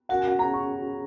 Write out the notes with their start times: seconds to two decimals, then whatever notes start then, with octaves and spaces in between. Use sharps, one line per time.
0.09 C#4 F#4 A#4 F#5
0.18 G#5
0.27 F#5
0.38 C#4 G#4 C#5 A#5
0.53 C#6